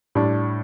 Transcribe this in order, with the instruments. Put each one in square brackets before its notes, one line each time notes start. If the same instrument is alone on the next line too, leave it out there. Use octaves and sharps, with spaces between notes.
[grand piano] A2 G3 D4